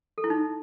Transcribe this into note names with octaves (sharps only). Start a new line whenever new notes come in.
A4
E4
D#4